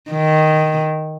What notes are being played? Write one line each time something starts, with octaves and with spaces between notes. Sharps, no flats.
D#3